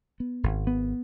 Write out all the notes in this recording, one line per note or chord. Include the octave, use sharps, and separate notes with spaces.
B3
G#1
B3